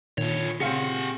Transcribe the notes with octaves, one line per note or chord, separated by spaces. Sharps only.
A#2 D3 D#3 C#5
C#3 C4 G4 G#4 F5 F#5 C#7